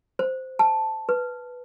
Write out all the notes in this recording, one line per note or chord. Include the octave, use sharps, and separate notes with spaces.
C5
A5
B4